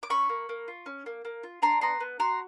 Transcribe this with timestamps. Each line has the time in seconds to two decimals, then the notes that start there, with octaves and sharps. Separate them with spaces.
0.03 D6
0.10 C#4 B5 C#6
0.29 A#3
0.49 A#3
0.68 F4
0.86 C#4
1.06 A#3
1.25 A#3
1.43 F4
1.62 D4 A#5 C6
1.81 B3 A#5 C6
2.00 B3
2.19 F#4 A#5 C6